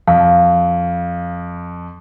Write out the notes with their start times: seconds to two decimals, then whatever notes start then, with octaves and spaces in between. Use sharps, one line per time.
0.07 F2 F5